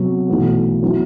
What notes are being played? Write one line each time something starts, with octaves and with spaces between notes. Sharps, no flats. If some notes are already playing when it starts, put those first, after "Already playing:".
Already playing: C3 F#3 B3
B1 A2 E3 B3 F#4
F#3 B3 E4